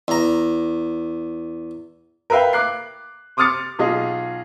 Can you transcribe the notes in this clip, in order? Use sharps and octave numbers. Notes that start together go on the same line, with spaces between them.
E2 A#5
A#4 B4 E5 F5 G5
D6 F#6 C7
C6 D6 D#6 F6 A6 C#7
B1 F4 G#4 D#5